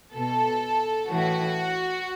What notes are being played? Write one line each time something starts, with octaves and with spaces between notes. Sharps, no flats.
B2 A4
A2 E3 F#4